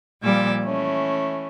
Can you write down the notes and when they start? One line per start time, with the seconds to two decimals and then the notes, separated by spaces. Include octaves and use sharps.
0.23 A#2 F3 G3 G#5 D6 E6
0.62 E3 A3 C#4